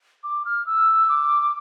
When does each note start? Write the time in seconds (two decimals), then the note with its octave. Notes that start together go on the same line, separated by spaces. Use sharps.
0.24 D6
0.45 F6
0.67 E6
1.09 D6